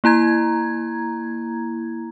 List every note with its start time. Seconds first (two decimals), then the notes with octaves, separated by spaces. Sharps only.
0.04 A#3 E4 A#5 G#6